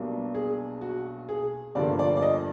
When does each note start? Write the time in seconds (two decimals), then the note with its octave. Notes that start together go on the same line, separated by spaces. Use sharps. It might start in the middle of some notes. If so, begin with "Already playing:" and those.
Already playing: B1 B2 G3 A#3 D4
0.35 G#4
0.81 F#4
1.29 G#4
1.75 G1 G2 D3 F3 A#3 D5
1.99 D5
2.17 D5
2.22 D#5